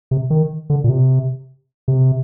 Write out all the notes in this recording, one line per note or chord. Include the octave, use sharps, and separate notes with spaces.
C3
D#3
D3
A#2
C3
C3